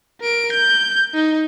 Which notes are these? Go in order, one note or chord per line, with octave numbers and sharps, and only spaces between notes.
A#4 D7
G6
D#4